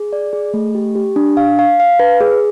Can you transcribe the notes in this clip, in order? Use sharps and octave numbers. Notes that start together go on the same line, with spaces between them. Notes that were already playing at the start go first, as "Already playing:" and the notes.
Already playing: G#4
D5
G#4
A3
G4
G4
D4
F5
F5
F5
B4
G#4